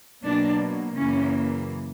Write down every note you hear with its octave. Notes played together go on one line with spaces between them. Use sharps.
B2 F#3 A#3 D4
F#2 C#3 E3 A#3 C#4